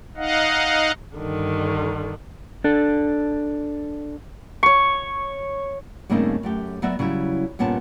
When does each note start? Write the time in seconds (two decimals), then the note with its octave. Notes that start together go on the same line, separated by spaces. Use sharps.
0.17 D#4 D#5 F5 F#5
1.16 G2 D3 D#3
2.64 D4 A4
4.63 C#5 C#6
6.10 G2 C#3 A3 A#3 C4 D#4
6.43 F#2 A3 G4
6.82 F#3 B3 F#4 D5 E5
6.99 C#3 F#3 G3 E4
7.59 G2 A#2 B3 C#4 A5